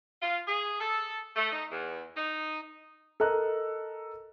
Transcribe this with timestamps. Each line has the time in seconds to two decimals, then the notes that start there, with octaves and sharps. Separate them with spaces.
0.22 F4
0.47 G#4
0.81 A4
1.36 A3
1.52 D#4
1.70 E2
2.16 D#4
3.20 A4 A#4 D#5 A#5 F#6